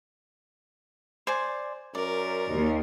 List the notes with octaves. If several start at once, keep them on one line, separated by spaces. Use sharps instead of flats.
C5 D5 G#5
F#2 A#4 D5
D#2